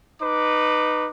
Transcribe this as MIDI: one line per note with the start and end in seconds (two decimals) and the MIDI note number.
0.22 1.09 63
0.22 1.09 71
0.22 1.09 86